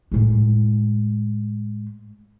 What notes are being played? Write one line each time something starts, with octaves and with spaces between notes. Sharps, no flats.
A2 G#3